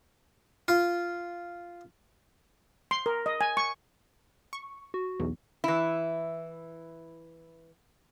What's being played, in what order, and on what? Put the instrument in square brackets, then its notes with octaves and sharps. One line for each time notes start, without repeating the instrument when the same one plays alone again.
[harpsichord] F4
[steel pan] C6
A#4
D#5
G#5
C#6
[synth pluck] C#6
[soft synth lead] F#4
[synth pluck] B1 E2
[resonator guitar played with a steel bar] E3 E4